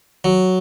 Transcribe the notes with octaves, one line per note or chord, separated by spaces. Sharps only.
F#3